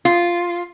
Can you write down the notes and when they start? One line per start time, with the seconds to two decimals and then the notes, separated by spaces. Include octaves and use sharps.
0.05 F4